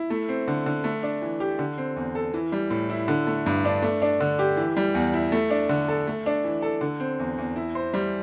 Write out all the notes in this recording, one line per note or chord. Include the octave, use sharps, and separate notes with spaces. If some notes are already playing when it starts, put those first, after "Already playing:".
Already playing: E4
A3
C4
D3
D3
A3
D4
E3
G4
D3
C4
E2
A4
E3
G3
A2
E4
D3
A3
G2
D4
A3
D4
D3
G4
E3
G3
E2
E4
A3
D4
D3
A4
A3
D4
E3
A4
D3
C4
E2
E2
E4
C5
G3